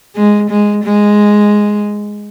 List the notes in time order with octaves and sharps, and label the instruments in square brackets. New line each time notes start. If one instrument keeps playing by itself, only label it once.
[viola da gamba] G#3
G#3
G#3